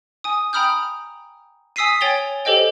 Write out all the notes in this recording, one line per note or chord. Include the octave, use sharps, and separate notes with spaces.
G#5 D#6
G5 A#5 B5 D#6 F6 G6
G#5 D#6 E6 B6 C7 D#7
C#5 G5 G#5 A6 F7 G7
G4 A4 C5 D#5 G5